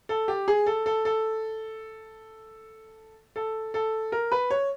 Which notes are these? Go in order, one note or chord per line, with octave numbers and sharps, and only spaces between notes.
A4
G4
G#4
A4
A4
A4
A4
A4
A#4
B4
C#5